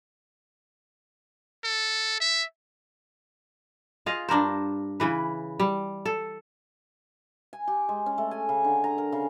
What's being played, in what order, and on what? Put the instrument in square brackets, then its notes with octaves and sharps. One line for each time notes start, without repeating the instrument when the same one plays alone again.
[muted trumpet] A4
E5
[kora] F4 G#4 D#5 F5
G2 D4 A#4 C5
C#3 E3 B4
G3
A4
[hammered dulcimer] G#5
G4
G#3
C#4
A3
G#5
C#3
D3
A#5
A#4
C#3